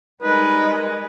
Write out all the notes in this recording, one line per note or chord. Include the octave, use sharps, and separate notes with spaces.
G3 G#3 D#4 A#4 B4 D#5